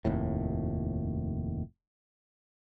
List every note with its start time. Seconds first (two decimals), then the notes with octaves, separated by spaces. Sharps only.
0.05 F1 D#2 A2